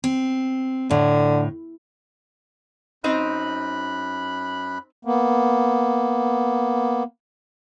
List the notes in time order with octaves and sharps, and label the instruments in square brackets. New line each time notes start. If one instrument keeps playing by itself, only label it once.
[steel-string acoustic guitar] C4
[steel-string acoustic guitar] A2 [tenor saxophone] D3
[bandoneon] F#2 B5 F#6 [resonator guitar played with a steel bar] C4 D#4 C5
[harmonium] A#3 B3